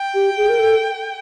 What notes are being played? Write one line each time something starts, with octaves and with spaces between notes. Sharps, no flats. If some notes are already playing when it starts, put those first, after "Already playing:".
Already playing: G5
G4
G#4
A#4
A4